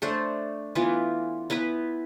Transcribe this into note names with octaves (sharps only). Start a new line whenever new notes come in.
A3 D4 A4 C5
E3 B3 F4
B3 E4 B4